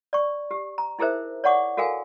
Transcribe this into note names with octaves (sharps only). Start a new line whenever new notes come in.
D5 C#6
G4
A#5
D#4 E4 G#4 A#4 C5 E5
C#5 D5 F#5 C#6 D6
F#4 A4 A#4 F5 G#5